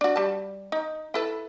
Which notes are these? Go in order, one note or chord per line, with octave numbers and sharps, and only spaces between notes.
D4 F#4
G3 A5
D#4
E4 A4 B4